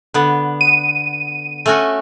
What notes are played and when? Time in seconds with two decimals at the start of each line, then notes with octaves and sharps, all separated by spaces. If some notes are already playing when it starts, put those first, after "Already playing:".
0.14 D3 B3
0.61 D#7
1.66 A3 C#4 F#4